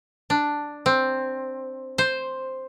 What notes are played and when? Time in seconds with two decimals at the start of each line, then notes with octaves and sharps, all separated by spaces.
0.30 D4
0.86 C4
1.98 C5